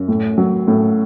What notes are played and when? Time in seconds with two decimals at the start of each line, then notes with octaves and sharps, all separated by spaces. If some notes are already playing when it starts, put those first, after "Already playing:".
Already playing: F#2
0.08 A2
0.38 F#3
0.68 A2